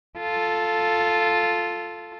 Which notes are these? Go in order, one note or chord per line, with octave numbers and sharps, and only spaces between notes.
F4 A4